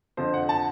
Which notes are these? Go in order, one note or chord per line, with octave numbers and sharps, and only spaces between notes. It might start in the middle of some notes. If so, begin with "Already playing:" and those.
F2 D3 F3 C5
F#5
A5